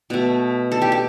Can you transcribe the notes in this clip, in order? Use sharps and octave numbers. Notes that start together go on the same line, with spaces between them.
B2 A3
A4
G4
G4